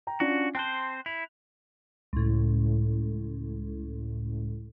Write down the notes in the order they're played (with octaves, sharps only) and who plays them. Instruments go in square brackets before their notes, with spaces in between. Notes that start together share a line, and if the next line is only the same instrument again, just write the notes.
[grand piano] G5 A#5
[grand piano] C#4 D4 F4 [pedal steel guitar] F#4
[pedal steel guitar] C4 C5 [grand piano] G5 A5 F#6
[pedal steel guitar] E4 [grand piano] F7
[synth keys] C#2 A2